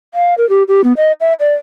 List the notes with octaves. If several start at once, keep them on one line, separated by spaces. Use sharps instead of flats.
F5
A#4
G4
G4
B3
D#5
E5
D5